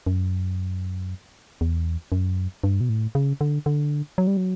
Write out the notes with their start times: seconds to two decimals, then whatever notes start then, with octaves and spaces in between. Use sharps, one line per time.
0.07 F#2
1.61 E2
2.12 F#2
2.64 G2
2.81 B2
2.89 A2
3.15 C#3
3.41 D3
3.66 D3
4.18 F#3
4.27 G3
4.37 F#3